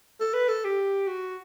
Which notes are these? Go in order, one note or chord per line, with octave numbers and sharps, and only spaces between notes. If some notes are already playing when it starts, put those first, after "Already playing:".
A4
B4
A4
G4
F#4